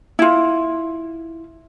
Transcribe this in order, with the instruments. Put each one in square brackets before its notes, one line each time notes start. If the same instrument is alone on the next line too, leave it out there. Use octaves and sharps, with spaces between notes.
[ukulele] E4 F4